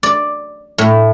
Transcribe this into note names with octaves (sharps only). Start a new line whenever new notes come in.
D5
A2